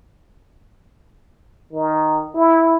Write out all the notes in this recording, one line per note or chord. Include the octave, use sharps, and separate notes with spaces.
D#3
E4